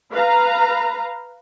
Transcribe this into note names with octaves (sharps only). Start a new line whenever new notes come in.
B4 F5 A#5